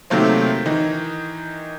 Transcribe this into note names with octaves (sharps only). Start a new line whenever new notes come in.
C3 D#3 F#3 A3 A#3 C4
D#3 E3 D#4